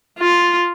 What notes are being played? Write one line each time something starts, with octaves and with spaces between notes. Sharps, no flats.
F4